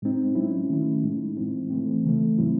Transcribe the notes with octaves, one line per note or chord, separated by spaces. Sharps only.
A2 G#3 C4 D#4
F#3 C#4 E4
D#3 A3 C#4 E4
A2 G#3 D#4
A2 E3 C4 E4
E3 A3 C4
C#3 E3 A3
A2 F#3 C4 E4